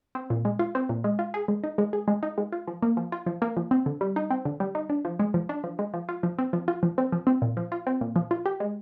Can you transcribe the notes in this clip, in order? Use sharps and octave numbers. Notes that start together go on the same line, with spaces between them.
C4
A#2
G#3
F4
C4
A#2
G#3
F4
G#4
G#3
D#4
G#3
G#4
G#3
D#4
G#3
F4
F3
A#3
F3
F4
F3
A#3
F3
C4
D3
G3
D#4
C4
D3
G3
D#4
D4
F3
G#3
F3
D4
F3
G#3
F3
F4
F3
C4
F3
F4
F3
C4
F3
C4
A#2
F3
F4
C4
A#2
F3
F4
G4
G#3